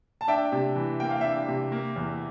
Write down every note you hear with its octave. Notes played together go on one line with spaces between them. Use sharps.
A5
D4 E5 G5
C3
E3
A#3 G5
F5
D4 E5 G5
C3
A#3
E2